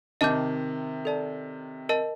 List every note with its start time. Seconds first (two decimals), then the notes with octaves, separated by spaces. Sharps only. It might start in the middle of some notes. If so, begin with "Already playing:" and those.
0.21 C3 D#3 D#5 A5 D6 G6
1.05 A4 D5 A5
1.89 A#4 D#5 A5